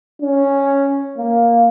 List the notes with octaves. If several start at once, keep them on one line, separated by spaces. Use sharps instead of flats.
C#4
A#3